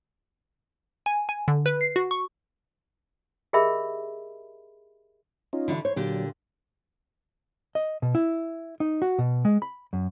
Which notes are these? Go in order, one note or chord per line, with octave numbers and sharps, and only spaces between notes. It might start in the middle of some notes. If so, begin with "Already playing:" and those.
G#5
G#5
D3
B4
C7
F#4
C#6
G4 G#4 A#4 D#5 E5 B5
C#4 D#4 F4
D3 E3 F#4
C5 C#5
A#2 D3 F#3 G4
D#5
B2
E4
D#4
F#4
B2
G#3
B5
F#2